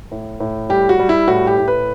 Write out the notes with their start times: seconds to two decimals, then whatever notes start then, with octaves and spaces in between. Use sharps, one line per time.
0.11 A2
0.40 A2
0.69 G3 G4
0.89 F#4
0.99 G3
1.09 E4
1.28 A2 F#4
1.47 G4
1.58 A2
1.68 B4